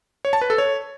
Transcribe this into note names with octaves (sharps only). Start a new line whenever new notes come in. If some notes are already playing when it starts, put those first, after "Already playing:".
C#5
A5
B4
A4
C#5